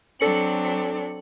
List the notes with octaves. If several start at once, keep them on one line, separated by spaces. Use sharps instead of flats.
F#3 C4 D4 A4 C#7 F#7